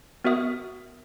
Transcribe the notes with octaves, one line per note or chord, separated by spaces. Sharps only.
B3 F#4 A#4 E5 D#6